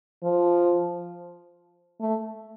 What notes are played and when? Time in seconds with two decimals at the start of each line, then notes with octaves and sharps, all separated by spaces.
0.24 F3
2.01 A3